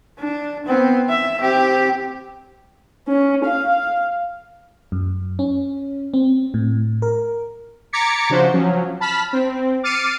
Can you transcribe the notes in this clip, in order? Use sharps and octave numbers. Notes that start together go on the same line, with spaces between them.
D4
B3 C4
E5
C4 G4
C#4
F5
F#2
C#4
C4
A2
A#4
A#5 D6 G#6 A6 B6 C#7
C#3 F3 D4 F#4 C5
F3 F#3 C#4
A5 B5 F6 B6
C4
D6 F6 A6 C7 C#7 D#7